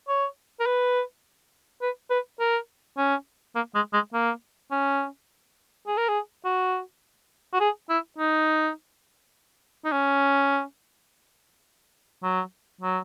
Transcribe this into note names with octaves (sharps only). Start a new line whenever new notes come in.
C#5
A#4
B4
B4
B4
A#4
C#4
A#3
G#3
G#3
A#3
C#4
G#4
A#4
G#4
F#4
F#4
G#4
E4
D#4
D#4
C#4
F#3
F#3